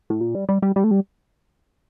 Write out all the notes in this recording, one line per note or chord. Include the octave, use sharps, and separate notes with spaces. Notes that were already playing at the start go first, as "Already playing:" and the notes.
A2
A#2
G3
G3
G3
G3
A3
G3